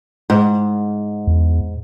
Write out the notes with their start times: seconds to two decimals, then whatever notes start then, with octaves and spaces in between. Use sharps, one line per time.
0.30 G#2
1.27 E2